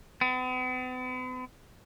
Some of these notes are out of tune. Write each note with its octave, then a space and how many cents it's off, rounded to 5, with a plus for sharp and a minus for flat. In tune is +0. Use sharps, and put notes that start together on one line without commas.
B3 +45